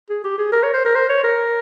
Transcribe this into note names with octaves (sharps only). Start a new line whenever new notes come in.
G#4
G4
G#4
A#4
C#5
C5
A#4
C5
C#5
A#4